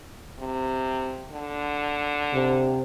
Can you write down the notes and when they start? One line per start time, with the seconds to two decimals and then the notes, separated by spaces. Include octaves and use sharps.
0.39 C3
1.31 D3
2.34 C3